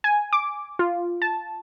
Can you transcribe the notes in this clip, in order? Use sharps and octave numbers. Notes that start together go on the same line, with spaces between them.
G#5
D6
F4
A5